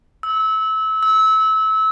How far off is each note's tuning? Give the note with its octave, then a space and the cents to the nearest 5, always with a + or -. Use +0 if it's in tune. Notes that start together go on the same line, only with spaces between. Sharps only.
E6 -25
E6 -25